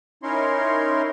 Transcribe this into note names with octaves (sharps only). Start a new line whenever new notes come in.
C#4 D#4 E4 A#4 C#5 C6